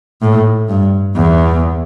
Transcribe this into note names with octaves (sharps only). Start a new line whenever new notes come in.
A2
G2
E2